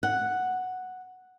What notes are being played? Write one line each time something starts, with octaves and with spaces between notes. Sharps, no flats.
F#5